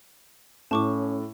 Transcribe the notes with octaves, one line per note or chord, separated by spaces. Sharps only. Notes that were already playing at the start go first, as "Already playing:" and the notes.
A2 C#4 A5 C#6 D6